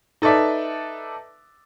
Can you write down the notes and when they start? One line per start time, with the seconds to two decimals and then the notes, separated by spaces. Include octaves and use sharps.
0.22 D#4 A4 B4 D5 E5